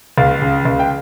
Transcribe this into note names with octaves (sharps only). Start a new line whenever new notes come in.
C#2 F5
C#3
C#2
G5